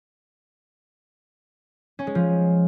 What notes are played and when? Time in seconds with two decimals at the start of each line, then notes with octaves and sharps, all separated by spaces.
1.99 C#4
2.07 G#3
2.15 F3